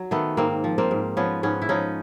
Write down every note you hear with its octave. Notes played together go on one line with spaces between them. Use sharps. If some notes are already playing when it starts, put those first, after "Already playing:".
Already playing: F#3
D#3 A3 B3
G#2 A#3 C4
F3
A#3 C4
G#2
F3 B3 C#4
G#2 B3 C#4
E4
F3 C#4 D#4